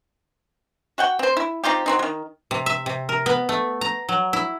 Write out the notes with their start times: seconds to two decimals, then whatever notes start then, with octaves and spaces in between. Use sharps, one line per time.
0.98 F#4 F#5 G5
1.19 C4 C5
1.37 E4
1.64 C4 D#4 F4 G4
1.86 F#3 C4 D#4
1.99 D#3 F#3
2.51 C3
2.66 E5
2.86 C3
3.09 A#4
3.26 B3
3.49 A3
3.81 A#5
4.09 F#3
4.33 E4